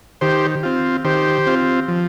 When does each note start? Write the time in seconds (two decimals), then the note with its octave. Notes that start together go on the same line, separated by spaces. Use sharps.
0.21 D#3 G4 C5
0.63 C4 F4
1.05 D#3 G4 C5
1.47 C4 F4
1.88 F3